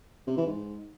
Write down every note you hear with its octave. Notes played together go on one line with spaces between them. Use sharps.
C3
E3
G#2